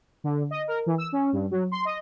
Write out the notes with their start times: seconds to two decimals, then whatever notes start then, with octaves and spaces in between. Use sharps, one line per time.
0.24 D3
0.51 D#5
0.68 A#4
0.86 E3
0.98 E6
1.12 C#4
1.33 G2
1.51 F#3
1.72 C6
1.85 D#5